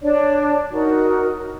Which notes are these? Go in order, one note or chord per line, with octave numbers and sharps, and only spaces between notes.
D4 C#5 D5
D#4 F#4 A#4